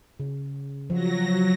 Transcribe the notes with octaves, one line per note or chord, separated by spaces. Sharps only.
C#3
F3 F#3 A#6